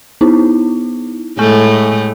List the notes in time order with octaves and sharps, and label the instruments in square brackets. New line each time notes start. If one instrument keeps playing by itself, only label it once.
[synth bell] B3 D#4 E4
[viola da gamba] A2 G#3 A3 [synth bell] G#5 C#6 G6